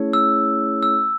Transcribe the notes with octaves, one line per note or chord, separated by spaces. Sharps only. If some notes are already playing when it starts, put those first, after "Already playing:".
Already playing: A3 C#4 E4 G#4 C#5
E6
E6